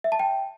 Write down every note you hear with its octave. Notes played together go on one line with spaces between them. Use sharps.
E5
A5
G5